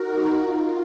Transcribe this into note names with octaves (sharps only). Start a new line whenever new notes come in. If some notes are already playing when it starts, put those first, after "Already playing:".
Already playing: D#4 F#4 A#4
F4